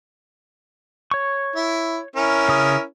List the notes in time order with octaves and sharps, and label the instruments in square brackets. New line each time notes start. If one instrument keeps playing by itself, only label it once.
[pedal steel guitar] C#5 C#6
[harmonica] E4
C#4 E4 A#4
[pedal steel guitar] C#3 D#6